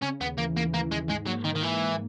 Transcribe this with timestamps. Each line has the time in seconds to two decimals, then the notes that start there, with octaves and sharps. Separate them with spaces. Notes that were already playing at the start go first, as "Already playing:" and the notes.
0.02 C#3 C#4
0.21 D#2 B3
0.38 E3 A#3
0.56 E3 A#3
0.74 E3 A#3
0.91 D#2 G#3
1.09 G#2 G#3
1.27 F#3 A#3
1.45 D#3 A#3
1.56 D#3
1.62 G#2 E3
1.80 G#2